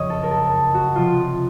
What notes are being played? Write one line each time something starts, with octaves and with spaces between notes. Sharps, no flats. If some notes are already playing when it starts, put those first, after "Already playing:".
Already playing: F#1 F2 C#3 F3 C#5 D#5
A4
A#4
A4
F#4
C3 F3 F4